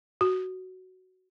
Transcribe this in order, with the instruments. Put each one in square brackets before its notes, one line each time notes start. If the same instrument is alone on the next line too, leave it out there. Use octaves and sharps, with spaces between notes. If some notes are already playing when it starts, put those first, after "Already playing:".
[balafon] F#4